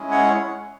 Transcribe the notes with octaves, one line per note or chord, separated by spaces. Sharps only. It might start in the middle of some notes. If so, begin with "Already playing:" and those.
Already playing: G#3 C#4 E4 G#4
C#5 F#5